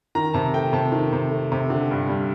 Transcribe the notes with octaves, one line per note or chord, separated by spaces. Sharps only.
D#3 A#5
C3 A5
A3 G5
C3 A5
D#3
C3
A3
C3
D3
G2
G3